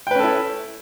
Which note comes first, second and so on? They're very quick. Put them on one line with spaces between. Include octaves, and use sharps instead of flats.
G5 B4 C#4 A4 E4